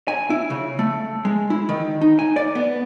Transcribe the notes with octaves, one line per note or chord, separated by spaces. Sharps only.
G#5
E4
C#3
A3
G#3
E4
D#3
D#4
G#5
D5
B3